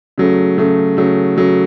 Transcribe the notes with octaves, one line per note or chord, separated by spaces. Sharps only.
C#3 F#3 A3
C#3 F#3 A3
C#3 F#3 A3
C#3 F#3 A3